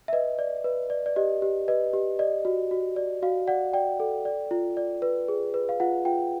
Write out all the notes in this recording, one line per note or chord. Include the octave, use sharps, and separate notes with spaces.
E5
B4 D#5
D5
B4
D5
D5
G4 D#5
G4
B4 D#5
G4
D5 D#5
F#4
F#4
D5
F#4 F5
D5 F#5
D5 G5
A4
D5
F4
D5
B4
G#4
B4
F5
F4 F#5
F4 G5